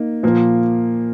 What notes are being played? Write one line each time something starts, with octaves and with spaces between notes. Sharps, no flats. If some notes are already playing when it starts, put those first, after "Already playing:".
Already playing: A#3 D#4
A#2 F3 A#3